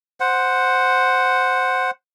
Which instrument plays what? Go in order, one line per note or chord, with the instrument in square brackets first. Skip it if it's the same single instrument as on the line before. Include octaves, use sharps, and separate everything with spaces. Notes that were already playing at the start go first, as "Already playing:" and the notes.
[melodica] C5 F#5